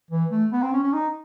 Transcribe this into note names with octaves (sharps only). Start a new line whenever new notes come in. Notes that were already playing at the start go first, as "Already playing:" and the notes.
E3
A3
B3
C4
C#4
C#4
D#4